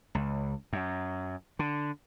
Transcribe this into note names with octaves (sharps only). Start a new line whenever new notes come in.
C#2
F#2
D3